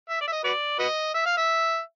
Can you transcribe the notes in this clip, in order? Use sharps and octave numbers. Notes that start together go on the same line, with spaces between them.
E5
D5
E5
D#5
F#4 B4 D5
F#4 B4 D#5
E5
F5
E5